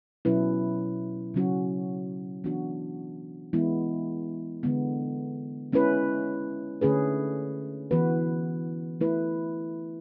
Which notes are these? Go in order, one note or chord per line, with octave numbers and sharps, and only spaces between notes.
B2 F#3 C#4 E4 B4
C#3 F#3 C#4 F#4
E3 B3 D4 F#4
E3 G#3 B3 E4
D3 G#3 B3
G#3 C#4 E4 B4
D3 A3 C#4 G#4 B4
E3 B3 F#4 B4
A3 E4 B4